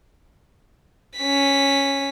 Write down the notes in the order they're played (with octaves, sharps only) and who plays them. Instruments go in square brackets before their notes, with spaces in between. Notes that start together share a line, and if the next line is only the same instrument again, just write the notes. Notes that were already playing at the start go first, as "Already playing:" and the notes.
[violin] C#4 B6